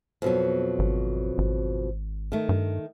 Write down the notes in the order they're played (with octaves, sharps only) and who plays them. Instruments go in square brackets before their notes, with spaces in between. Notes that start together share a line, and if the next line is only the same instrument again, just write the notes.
[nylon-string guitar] F2 B2 F#3
[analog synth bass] G#1
G#1
[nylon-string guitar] D#3 A3
[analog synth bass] G2